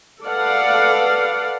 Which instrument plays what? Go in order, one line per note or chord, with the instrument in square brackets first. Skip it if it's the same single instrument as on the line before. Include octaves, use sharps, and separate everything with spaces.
[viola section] A4 B4 D5 F5 F#5